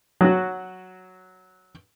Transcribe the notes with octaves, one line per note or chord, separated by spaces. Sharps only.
F#3 F#4